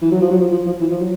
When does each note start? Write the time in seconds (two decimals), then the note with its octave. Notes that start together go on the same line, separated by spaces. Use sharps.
0.02 E3
0.12 F#3
0.21 F3
0.31 F#3
0.41 F3
0.51 F3
0.66 F3
0.80 E3
0.91 F3
1.00 F#3